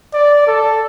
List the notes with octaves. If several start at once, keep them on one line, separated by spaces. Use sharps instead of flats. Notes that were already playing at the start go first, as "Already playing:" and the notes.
D5
A4